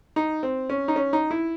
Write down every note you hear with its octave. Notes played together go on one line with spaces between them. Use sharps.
D#4
C4
C#4
D#4
C#4
D#4
E4